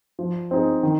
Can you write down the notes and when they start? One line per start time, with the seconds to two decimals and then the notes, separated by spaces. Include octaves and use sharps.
0.19 F3
0.51 C4 D#4 G#4
0.83 D#3